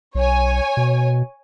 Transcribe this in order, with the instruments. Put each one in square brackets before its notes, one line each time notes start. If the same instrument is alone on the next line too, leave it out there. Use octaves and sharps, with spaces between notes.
[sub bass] B1 [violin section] C#5 G#5
[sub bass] B2